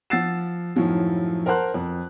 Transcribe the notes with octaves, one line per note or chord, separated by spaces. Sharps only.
F3 F#5 E6 A6 C7 E7
F#2 A2 D#3 F3 F#3
A#4 C5 F#5 A5 C6 F#6
F2